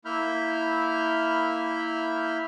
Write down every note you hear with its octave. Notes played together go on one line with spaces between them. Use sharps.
A#3 E4 E5 B5 F6 G6